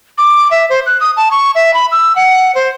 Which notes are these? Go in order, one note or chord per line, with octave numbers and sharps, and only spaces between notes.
D6
E5
C5
F#6
D#6
A5
C#6
E5
B5
E6
F#5
C5